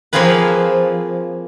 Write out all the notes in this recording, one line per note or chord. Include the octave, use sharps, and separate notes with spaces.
F3 A#3 C4 F4 G#4 B4